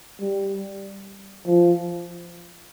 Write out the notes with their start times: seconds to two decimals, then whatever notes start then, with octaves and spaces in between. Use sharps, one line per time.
0.20 G3
1.47 F3